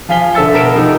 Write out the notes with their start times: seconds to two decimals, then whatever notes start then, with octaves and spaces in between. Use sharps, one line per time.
0.09 F3 F5 G#5 B6 G7
0.34 D3 A4 E5 E6 A6 C#7
0.53 B2 A#4 B6 D7 E7
0.74 C3 F3 D#4 A4